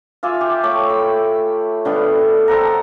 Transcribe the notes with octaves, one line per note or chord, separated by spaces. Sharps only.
F4 E5 G#5 D6
G4 G5
A3 C#5 D6
B5
D3 G3 B3
A4 C5 F#5 A#5